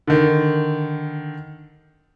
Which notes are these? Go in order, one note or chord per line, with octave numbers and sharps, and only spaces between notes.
D3 D#3